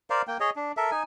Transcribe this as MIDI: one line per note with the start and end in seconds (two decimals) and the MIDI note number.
0.10 0.22 70
0.10 0.22 72
0.10 0.22 74
0.10 0.22 77
0.27 0.37 58
0.27 0.37 79
0.40 0.50 68
0.40 0.50 73
0.40 0.50 75
0.56 0.72 62
0.77 0.91 69
0.77 0.91 70
0.77 0.91 76
0.91 1.03 63
0.91 1.03 80